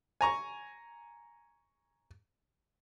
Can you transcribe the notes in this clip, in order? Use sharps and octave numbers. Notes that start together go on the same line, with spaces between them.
G#5 A#5 C#6